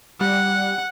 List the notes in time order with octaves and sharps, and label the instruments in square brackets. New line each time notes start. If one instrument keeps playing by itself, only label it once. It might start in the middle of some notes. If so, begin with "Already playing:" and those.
[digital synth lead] G3 [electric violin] F#5